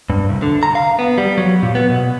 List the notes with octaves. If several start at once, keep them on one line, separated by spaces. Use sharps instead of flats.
G2
C2
D3
A#5
F5
B3
G3
F#3
A#2
B3
B2